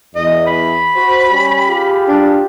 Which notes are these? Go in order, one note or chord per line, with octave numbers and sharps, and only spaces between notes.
E2 D#5
B5
F#4 C5
G3 C#4 G4
F4 G4 G#4
D4